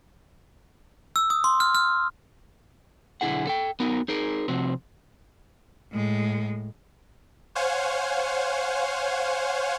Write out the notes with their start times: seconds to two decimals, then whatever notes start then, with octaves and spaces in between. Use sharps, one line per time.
1.16 E6
1.30 D#6
1.44 C6
1.60 F6
1.75 F6
3.21 B1 D3 E4 G#4 F#5
3.47 A4 G5
3.80 B3 D#4 F#4 A#4
4.08 D#4 G#4 A#4
4.48 C3 F3 C4 F#4
5.92 A2 G#3
7.55 C5 C#5 F5 F#5 G#5